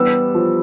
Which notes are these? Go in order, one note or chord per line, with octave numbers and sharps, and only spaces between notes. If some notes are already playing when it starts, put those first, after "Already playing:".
Already playing: E3 G3 B3 E6
F3